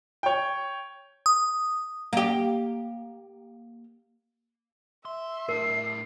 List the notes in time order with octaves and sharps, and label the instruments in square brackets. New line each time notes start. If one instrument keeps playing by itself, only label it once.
[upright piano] C#5 G5
[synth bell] D#6
[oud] A#3 G4
[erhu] E5 [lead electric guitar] C6
[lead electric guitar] A2 D4 [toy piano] A#4 [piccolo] C7